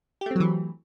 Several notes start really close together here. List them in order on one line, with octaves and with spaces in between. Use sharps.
G4 A3 C4 F#3 E3